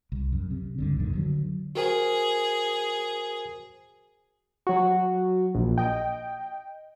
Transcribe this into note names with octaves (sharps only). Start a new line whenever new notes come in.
C2
F#2
C3
C#2 G2 D3
F#2 A#2 D3 D#3
D3 D#3 F#3
F#4 G#4 A#4 C5
F#3 F#4
A#1
D#5 G5